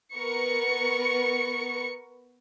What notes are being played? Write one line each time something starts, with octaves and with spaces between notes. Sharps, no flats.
B3 A#4 B4 C#6 C#7